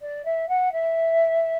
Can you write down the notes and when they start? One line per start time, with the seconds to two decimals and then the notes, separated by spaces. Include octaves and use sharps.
0.01 D5
0.24 E5
0.48 F#5
0.72 E5